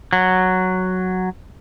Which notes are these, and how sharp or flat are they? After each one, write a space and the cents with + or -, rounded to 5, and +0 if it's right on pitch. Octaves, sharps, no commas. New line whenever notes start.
F#3 +0